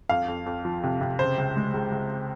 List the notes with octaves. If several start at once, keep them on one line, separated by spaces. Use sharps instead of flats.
F2 F5
F2
F2
F3
C3
C3
C#3 C5
C#2
G#3
C#2
C#2